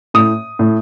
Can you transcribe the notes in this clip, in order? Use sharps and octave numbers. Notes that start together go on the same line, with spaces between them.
A2 D#6
A2